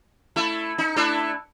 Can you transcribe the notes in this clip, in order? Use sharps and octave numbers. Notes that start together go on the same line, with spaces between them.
A3 E4
D#4
A3 D4 E4